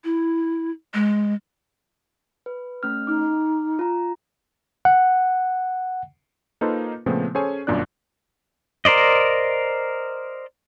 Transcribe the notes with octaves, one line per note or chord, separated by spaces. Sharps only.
E4
G#3
B4
A3 C#4 F6
D#4 D6 F6
F4 A#5
F#5
A#3 D#4 F4 A4 B4 C5
A#2 C#3 F3 A3 B3 C4
C#4 G#4 A4 C5 C#5 G#5
G1 F#2 A#2 D4 D5 F#6
A#4 C5 D5 D#5